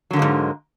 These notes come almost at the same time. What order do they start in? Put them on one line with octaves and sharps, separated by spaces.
F#3 D3 A#3 G#3 G#2